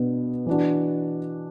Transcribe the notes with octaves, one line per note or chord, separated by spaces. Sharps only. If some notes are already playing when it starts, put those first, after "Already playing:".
Already playing: B2 B3 D4
E3 D4 F#4